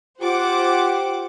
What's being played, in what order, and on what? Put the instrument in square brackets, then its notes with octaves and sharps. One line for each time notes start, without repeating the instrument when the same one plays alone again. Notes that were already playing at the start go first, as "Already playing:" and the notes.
[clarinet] F4 [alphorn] G4 [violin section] C5 F#5 D6